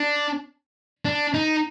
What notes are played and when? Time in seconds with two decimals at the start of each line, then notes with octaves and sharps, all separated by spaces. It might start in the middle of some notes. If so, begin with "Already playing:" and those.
Already playing: D4
1.05 D4
1.34 D#4